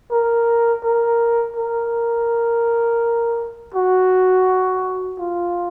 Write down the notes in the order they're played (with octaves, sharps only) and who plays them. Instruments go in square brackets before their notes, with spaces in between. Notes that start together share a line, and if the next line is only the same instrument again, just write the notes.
[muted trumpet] A#4
A#4
A#4
F#4
F4